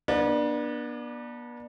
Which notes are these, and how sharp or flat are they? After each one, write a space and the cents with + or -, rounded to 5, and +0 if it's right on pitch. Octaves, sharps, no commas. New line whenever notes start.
B3 -40 D4 +15